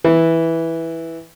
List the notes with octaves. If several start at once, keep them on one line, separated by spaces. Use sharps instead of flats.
E3